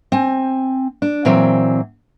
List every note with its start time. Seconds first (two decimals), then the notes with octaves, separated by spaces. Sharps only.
0.12 C4 G#5
1.02 D4
1.25 A#2 E3 F#3 C4